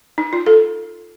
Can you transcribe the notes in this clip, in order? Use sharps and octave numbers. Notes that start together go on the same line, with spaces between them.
D#4
F4
A4